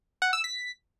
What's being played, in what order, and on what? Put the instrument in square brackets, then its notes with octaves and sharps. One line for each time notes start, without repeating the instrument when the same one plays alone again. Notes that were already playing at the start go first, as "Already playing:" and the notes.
[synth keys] F#5
E6
B6